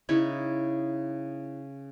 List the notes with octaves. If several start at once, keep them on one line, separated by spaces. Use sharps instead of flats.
C#3 D#4 E4 C#5